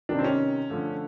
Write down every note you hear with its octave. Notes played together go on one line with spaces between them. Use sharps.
C3 D#3 G3 D4
C4
C#4
D3 F3 A3